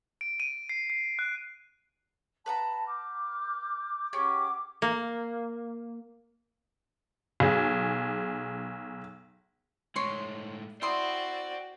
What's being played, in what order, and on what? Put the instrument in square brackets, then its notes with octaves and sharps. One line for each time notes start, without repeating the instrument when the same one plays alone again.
[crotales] D7
D#7
C7
C7
F#6
[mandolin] B4 F#5 A#5 [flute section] A5
[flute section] D6 F6 G6
[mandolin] C#4 G4 G#4 [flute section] F#5 D6
[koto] A#3
[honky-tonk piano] B1 G#4
[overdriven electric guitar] A2 G#3 [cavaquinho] C#5 C6 C#6
[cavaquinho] E4 C6 D#6 [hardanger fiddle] F#4 D5 [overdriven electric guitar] C5 G5